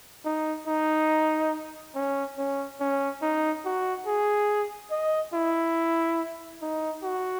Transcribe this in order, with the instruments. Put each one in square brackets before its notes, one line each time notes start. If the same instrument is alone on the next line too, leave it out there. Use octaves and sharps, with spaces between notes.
[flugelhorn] D#4
D#4
C#4
C#4
C#4
D#4
F#4
G#4
D#5
E4
D#4
F#4